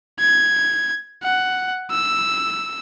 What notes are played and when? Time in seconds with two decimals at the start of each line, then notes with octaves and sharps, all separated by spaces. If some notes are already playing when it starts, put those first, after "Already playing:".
0.20 G#6
1.23 F#5
1.91 E6